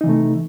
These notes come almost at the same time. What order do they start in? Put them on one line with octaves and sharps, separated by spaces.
D#4 E3 C3 A3